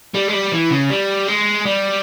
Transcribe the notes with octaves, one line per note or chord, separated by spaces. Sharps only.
G3
G#3
G3
E3
C#3
G3
G#3
G3